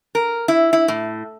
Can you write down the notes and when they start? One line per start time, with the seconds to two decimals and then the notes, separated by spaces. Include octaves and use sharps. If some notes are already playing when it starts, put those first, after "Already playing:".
0.15 A#4
0.48 E4
0.73 E4
0.88 A2